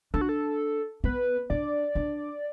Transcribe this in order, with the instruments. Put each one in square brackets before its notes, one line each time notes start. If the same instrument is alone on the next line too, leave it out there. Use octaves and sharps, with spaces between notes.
[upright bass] D4 [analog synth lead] A4
[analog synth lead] F#4
A4
[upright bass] B3 [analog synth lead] B4
[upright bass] D4 [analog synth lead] D5
[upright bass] D4